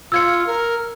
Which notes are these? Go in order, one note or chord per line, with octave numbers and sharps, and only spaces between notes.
F4 E6 G#6 C#7
A#4